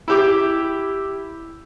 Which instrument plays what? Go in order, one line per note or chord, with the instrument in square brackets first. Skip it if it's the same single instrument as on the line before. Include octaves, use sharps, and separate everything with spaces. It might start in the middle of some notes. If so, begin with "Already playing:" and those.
[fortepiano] E4 G4 D6